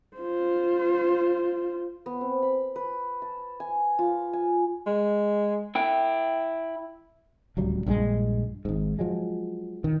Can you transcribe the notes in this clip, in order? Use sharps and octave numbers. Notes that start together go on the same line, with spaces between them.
F4 C5
B3
C4
B5
B4
A5
G#5
F4
G#5
G#3
E4 G5
D1 C#2 F#3 G3
A#1 G2 F3 G#3
G#1 G#2
F3 F#3 G#3
D#3